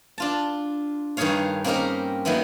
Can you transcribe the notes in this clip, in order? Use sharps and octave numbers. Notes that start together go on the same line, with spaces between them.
D4 F4 A5
G2 D#3 D#4 G#4 C#5 F5
A#3 C4 C#4 D#4 G4 A#4
D#3 F#3 A#3 B3 E4